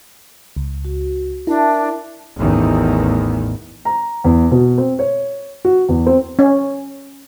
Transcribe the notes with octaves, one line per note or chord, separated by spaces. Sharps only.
C#2
F#4
D4 E4 A#4 E5 A5
A1 E2 D#3
A#5
E2
B2
C4
C#5
F#4
E2
C4
C#4